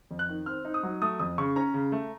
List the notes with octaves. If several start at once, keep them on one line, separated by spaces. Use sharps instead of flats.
F2
F#6
D#3
C4 F6
D#4
D#6
F#3
A3 D#6
F2 D#6
C#3 C#6
C#4 A#5
C#3
A3